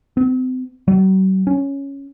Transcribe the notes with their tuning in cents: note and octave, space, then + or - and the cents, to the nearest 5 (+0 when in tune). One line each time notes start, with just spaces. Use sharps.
C4 -35
F#3 +45
C#4 +0